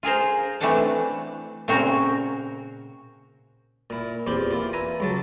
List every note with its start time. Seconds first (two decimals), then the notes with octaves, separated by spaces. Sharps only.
0.03 F4 G#4 A#4 C5
0.61 E3 A3 C4 D4 F#5 A5
1.68 A#2 C#3 C4 F#4 A#4
3.90 A#2 E4
4.27 E2 A#2 C4 G4 B5
4.50 E4 F4
4.73 B4 E5 G#5 A#5
5.00 C#2 F#3 A5